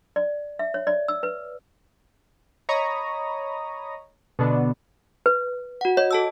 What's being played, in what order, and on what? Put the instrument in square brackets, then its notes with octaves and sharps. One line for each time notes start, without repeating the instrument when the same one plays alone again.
[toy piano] D5
E5
C#5
D5
E6
B4
[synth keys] C#5 D#5 A#5 B5 C#6 D#6
B2 D3 B3 D4
[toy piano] B4
[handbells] F#4 F#5
[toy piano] C#5 [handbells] D#5
[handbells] A4 A5 E6